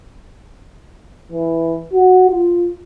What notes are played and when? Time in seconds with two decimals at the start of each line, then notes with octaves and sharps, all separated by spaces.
1.32 E3
1.94 F#4
2.29 F4